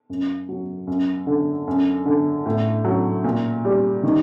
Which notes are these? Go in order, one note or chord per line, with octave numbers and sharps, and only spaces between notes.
F#2
F#3
F#2
D3
F#2
D3
A2
F#3
A#2
G3
D#3